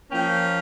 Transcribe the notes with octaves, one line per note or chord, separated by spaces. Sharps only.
F3 A#3 C#4 G5